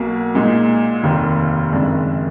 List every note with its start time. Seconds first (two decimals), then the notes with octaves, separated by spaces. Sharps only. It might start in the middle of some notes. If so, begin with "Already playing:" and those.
Already playing: B1 B2 A#3
0.35 A#2 G#3 D#4
1.03 F1 D#2 D#3
1.72 F#1 F2 D#3 G#3 D4